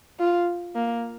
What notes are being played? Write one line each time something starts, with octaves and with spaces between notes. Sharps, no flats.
F4
A#3